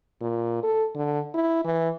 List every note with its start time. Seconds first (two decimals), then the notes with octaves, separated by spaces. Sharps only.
0.21 A#2
0.63 A4
0.95 D3
1.34 E4
1.64 E3